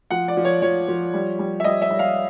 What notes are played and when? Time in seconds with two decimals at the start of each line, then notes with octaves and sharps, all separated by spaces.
0.11 F3 F#5
0.28 D5
0.37 F3
0.45 C#5
0.62 F3 C#5
0.88 F3
1.14 G3
1.39 G3
1.60 E5
1.64 G3 D#5
1.82 E5
1.90 G3
1.99 F5